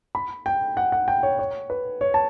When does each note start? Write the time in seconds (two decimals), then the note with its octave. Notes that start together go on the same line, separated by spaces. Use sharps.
0.15 B5
0.46 G5
0.77 F#5
0.92 F#5
1.08 G5
1.23 C#5
1.39 C#5
1.70 B4
2.01 C#5
2.14 A5